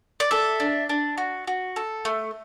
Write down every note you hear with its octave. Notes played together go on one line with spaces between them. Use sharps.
D5
A4 E5
D4
D4
F#4
F#4
A4
A3